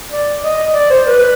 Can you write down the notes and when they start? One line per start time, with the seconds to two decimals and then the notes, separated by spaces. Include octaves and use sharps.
0.12 D5
0.43 D#5
0.74 D5
0.90 C5
1.06 B4